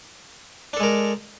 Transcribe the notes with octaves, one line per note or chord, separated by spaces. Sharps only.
G#3 D4 A4 A#4